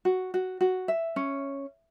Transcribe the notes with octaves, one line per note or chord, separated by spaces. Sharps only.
F#4
F#4
F#4
E5
C#4